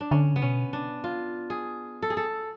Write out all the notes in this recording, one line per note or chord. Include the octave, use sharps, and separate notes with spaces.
D4
D3 C#4
C#3 B3
B2 C#4
D4
F4
G#4
A4
G#4
A4